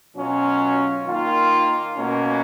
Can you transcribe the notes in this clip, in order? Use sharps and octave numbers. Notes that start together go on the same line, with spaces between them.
B2 F#3 C#4 F4
D#3 A#3 F4
B2 A#3 C#4